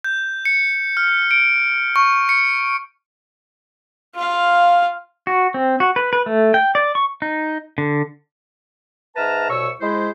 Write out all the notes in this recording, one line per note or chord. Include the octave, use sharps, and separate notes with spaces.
G6
C#7
F6
D7
C#6
C#7
F4 F5
F#4
C4
F#4
B4
B4
A3
G5
D5
C#6
D#4
D3
G#2 B4 E5 A5 A#5 F6
C2 B2 C#5 C#6 E6
G#3 E4 C5